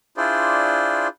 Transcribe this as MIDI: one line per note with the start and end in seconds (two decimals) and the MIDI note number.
0.17 1.08 62
0.17 1.08 64
0.17 1.08 65
0.17 1.08 68
0.17 1.08 72
0.17 1.08 74